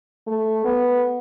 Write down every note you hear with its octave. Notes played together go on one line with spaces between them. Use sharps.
A3
B3